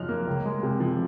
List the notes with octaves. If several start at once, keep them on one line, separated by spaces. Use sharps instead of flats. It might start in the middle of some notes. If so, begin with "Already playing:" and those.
Already playing: F#2 F3 D#4 F6 F#6
A#3
C#2
G#3
C3
F3